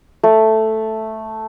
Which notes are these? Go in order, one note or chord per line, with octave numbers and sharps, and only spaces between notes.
A3